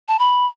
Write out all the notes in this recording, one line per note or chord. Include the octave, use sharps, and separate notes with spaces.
A5
B5